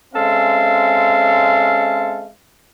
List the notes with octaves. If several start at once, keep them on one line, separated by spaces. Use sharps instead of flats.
G#3 C4 C#4 A4 E5 F5